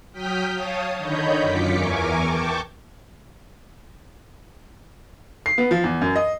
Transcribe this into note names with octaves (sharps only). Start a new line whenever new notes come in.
F#3 G5 D#6 F6 G6 B6
C#5 F5 A5 D#6
D3 D#3 C#5 D#5 B5 G6
F#2 F4 D6 B6 C#7
E2 E3 A#4 G#5 C#6 D6
G5 A5 C#6 D6
C7
B3
F3
E2
F#2
D#5